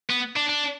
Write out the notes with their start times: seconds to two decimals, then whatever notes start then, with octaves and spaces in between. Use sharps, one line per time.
0.10 B3
0.36 D4
0.49 D4